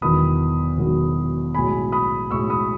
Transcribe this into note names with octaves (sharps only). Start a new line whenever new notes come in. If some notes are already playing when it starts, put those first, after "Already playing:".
E1 E2 D#3 F#3 B5 D#6
E1 E2 D#3 F#3
B1 A2 G#3 G#5 B5
B5 D#6
B1 A2 G#3 C#6 E6
B5 D#6